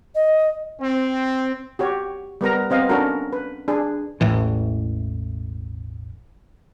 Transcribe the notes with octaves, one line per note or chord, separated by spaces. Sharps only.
D#5
C4
F#4 G4 C#5
G3 B3 A#4 A#5
B3 C4 D#5 F5
C#4 D4 F#4 A4 A#4
B4
D4 G#4
E1 A1 A2 E3